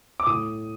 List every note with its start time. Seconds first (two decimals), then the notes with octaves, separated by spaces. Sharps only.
0.20 D6
0.26 A2 D#6